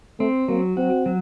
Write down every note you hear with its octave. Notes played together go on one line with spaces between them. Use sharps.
A3 C4
F#3 A#3
C4 F#4
F#3